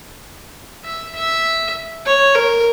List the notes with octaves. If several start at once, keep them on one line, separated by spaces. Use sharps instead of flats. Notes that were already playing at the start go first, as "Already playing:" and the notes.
E5
E5
C#5
A#4